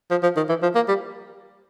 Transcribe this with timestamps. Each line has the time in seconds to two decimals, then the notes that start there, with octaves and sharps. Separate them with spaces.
0.10 F3
0.23 F3
0.36 D#3
0.49 E3
0.62 F3
0.75 A#3
0.88 G3